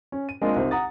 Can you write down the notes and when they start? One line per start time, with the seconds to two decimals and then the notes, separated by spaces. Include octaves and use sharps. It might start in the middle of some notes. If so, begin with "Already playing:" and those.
0.12 C#4
0.29 D#7
0.42 G#3 A#3 C4 D4 F4 D#5
0.56 C2 D#4 C5
0.71 F#5 A#5 D#6 A6